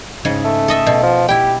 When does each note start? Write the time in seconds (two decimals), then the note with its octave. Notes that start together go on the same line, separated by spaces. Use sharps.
0.25 G#2 C#3
0.44 A3
0.68 A4 D#5 E5
0.86 B2
1.03 F3
1.28 E4 G4 G5